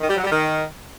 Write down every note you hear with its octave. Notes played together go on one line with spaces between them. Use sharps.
D#3
G3
F#3
G3
D#3